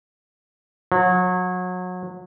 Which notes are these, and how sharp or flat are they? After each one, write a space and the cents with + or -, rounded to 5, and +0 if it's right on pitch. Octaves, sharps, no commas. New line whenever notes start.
F#3 -30